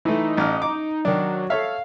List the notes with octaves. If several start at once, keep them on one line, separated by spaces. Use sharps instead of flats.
E3 A3 D#4
A1 F6
D6
D#3 F#3 D4
A4 C#5 E5 F5